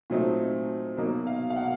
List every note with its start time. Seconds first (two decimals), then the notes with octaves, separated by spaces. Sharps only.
0.10 A#2 F#3 A3 C4 D#4
0.97 B2 F#3 A#3 D#4
1.27 F5
1.50 F5
1.56 F#5